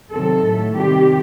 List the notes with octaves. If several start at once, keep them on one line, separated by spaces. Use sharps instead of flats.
C3 D#3 F#3 C4 A4
A2 F#3 A3
C3 D#3 G3 C4 G4